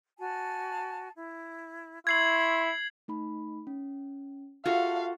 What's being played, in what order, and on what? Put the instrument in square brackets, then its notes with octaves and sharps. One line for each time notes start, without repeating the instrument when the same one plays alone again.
[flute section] F#4 G#5 A5
E4
[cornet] E4 [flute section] C6 C#6 E6 [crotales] G#6 C7 F#7
[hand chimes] A3 D#4 B5
C#4
[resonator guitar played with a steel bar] F4 F#4 A4 [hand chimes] G#4 E5 [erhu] F5